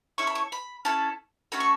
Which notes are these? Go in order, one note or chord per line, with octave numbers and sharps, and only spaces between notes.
C#4 E4 A4 C#6
B5
C#6
B5
C#4 E4 A4 A5
A3 C#4 F#4 A4 B5
C#6